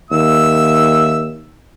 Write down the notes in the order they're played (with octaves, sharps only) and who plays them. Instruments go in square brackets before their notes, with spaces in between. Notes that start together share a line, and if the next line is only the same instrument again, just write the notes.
[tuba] D#2 [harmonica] E5 E6